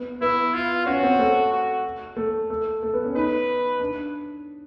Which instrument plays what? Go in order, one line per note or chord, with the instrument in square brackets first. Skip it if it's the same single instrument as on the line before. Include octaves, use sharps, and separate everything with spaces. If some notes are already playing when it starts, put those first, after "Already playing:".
Already playing: [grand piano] B3
[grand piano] B3 [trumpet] E4
[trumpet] F4
[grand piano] C#4 [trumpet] F#4
[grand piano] C4
A3
[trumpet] F#4
[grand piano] A3
A3
A3
B3
C#4
[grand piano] D#4 [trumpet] B4
[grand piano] D4